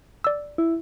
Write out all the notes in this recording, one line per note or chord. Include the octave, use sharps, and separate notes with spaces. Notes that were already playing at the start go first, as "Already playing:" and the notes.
D5 E6
E4